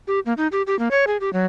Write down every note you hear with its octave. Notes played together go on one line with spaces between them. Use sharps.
G4
A#3
D#4
G4
G4
A#3
C#5
G#4
G4
F#3